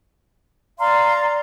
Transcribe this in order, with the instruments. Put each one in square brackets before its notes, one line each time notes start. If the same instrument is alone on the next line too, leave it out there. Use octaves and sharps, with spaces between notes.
[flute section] D5 F5 A#5 C6